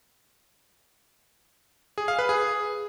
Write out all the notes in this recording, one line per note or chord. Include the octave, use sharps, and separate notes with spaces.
G#4
F5
B4
G#4